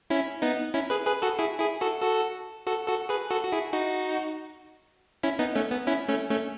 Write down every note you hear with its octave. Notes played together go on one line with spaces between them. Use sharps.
C#4 E4
B3 D#4
C#4 E4
G#4 B4
G#4 B4
F#4 A4
E4 G#4
E4 G#4
F#4 A4
F#4 A4
F#4 A4
F#4 A4
G#4 B4
F#4 A4
F#4
E4 G#4
D#4 F#4
C#4 E4
B3 D#4
A3 C#4
B3
C#4 E4
A3 C#4
A3 C#4